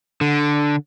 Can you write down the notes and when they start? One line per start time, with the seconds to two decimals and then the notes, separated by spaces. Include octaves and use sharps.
0.21 D3